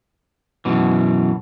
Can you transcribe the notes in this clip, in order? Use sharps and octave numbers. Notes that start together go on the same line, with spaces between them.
F#2 B2 E3